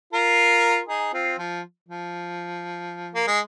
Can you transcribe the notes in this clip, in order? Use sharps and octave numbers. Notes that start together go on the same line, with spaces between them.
F4 A#4
D#4 G#4
C4 F4
F3
F3
A#3
G#3